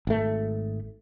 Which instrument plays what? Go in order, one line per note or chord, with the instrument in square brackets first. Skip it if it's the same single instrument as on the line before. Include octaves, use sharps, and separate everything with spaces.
[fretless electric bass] G#1 A3